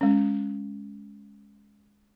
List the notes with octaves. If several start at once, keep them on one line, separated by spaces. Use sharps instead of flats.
G#3 C#4